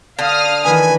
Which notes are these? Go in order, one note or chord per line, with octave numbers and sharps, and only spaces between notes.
D3 F5 D#6 F6
D#3 E3 B4 G#5